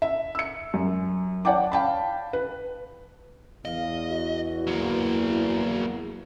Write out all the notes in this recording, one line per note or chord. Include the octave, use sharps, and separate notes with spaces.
E5
E6 C#7
F#2
C#5 D5 F#5 G5 A5 D6
F5 G5 A5 B5
B4
E2 D#5 F5
F#4
F#3 A#3